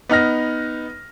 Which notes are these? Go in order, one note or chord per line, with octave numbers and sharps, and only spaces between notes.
B3 D#4 F6 A#6